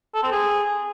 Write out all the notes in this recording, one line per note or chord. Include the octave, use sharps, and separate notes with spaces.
A4
C4
G#4